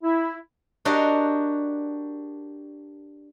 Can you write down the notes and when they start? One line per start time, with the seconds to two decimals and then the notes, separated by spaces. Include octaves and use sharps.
0.03 E4
0.85 D4 F#4 G4 A#4 D#5 F5